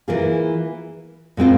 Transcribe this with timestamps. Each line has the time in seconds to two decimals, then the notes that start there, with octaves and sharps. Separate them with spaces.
0.08 E3 A#3 F4 G#4
1.37 A#2 G#3 C4 F4